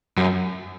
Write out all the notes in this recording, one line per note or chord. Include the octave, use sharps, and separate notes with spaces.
F#2